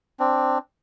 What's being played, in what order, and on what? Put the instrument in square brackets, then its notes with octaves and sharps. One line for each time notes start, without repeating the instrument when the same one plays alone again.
[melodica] C4 D4